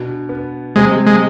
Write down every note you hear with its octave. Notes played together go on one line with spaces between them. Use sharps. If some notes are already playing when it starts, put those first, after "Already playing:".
Already playing: B2 D4
B3
C3 G#3
G#3